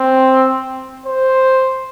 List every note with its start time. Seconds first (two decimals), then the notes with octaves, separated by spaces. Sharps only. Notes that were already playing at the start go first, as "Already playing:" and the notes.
Already playing: C4
1.06 C5